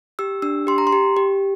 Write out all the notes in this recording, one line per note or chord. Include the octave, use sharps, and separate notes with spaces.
G4 E6
D4 E6
G4 C6
A#5
C6
G4
G4